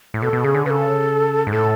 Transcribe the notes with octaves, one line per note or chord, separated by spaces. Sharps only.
A2
B2 A4
B2
C#3 G#4
D3
C#3 A4 B4
G#2
A2 A4